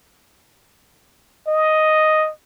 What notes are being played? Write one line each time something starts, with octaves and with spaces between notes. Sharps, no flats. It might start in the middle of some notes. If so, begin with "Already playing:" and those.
D#5